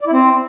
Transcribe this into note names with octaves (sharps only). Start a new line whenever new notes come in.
D5
E4
C4